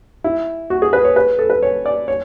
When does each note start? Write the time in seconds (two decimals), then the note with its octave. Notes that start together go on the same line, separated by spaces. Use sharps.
0.24 E4
0.70 F#4
0.82 G#4
0.93 B4
1.05 C#5
1.16 B4
1.39 A4
1.50 B4
1.63 C#5
1.86 D5
2.08 C#5